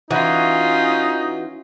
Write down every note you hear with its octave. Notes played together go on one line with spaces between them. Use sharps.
E3 C#4 D#4 F4 F#4